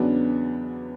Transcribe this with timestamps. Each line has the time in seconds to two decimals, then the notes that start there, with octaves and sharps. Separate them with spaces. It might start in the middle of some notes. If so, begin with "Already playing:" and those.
Already playing: E2 C#3 F#3 B3 D4